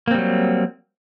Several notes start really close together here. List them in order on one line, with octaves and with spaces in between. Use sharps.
A#3 C4 G3 F#3